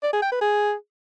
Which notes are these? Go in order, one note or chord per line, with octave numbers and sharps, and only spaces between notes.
D5
G#4
G5
B4
G#4